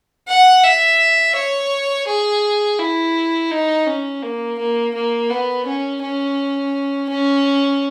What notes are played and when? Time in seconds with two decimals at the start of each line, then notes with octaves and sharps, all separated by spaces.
0.28 F#5
0.64 E5
1.36 C#5
2.07 G#4
2.79 E4
3.51 D#4
3.87 C#4
4.22 A#3
4.59 A#3
4.94 A#3
5.30 B3
5.66 C#4
6.02 C#4
7.09 C#4